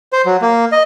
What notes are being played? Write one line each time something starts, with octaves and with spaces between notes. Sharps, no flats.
C5
F#3
A#3
D#5